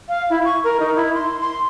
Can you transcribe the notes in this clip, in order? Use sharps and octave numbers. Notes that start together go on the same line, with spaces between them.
F5
E4
C#6
A#4
D#4
E4
C6
C6